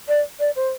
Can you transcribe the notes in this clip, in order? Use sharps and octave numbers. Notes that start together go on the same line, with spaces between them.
D5
D5
C5